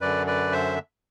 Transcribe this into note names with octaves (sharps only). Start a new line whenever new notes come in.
F#2 D3 B4 D5
B4 D5
C5 E5